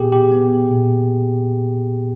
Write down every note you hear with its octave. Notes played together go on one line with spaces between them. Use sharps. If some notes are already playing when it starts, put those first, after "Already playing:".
Already playing: A#2 B3 G4 G#4
G4
B3
A#2